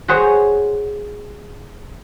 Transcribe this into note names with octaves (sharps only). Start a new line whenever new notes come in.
F#4 G#4 C5 C#5